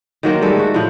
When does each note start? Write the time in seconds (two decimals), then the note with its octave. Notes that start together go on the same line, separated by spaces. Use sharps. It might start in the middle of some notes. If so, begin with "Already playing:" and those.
0.23 D#3 F#3 A#3 C5
0.42 G3 G#3 A4
0.56 A3 F#4
0.74 A2 F3